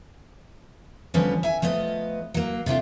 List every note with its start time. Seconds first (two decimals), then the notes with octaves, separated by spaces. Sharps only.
1.14 D3 F3 G3 B3 C#4
1.43 E5 G#5
1.62 F3 A3 B3 D#5
2.34 F#3 A#3
2.66 C3 A3 D4 F4